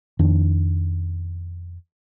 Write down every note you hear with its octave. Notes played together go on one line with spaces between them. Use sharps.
F2 D#3 D4